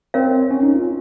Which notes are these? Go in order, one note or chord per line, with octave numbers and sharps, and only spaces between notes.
C4 A#4 C#5 F5
C#4
D#4
F4